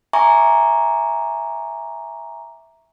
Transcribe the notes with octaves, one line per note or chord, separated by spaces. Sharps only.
E5 G#5 A#5 C#6 D6